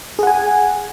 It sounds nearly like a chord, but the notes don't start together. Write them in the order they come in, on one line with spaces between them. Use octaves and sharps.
G#4 F#5 G#5